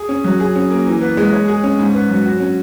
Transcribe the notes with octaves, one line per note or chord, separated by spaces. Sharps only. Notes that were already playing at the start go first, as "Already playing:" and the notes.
Already playing: G#4
C#4
F#3
G#4
C#4
A#3
E3
B3
G#3
C#5
G#4
C#4
G#2
B3
F#3
F#4
C#4